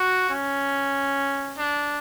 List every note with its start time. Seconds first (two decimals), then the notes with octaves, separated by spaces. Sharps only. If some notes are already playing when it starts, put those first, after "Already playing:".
Already playing: F#4
0.30 C#4
1.58 D4